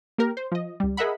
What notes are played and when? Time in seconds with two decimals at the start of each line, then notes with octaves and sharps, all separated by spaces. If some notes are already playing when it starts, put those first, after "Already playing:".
0.18 A#3 G4 A#4
0.37 C5
0.52 F3 D#5
0.80 C#2 G3
0.97 G#4 A#4 D#5 E5 F#5 B5